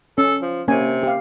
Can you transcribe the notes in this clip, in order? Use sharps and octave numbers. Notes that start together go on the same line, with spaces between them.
C#4 A4
F3
C3 A#3 C#4 G#5
G4 F5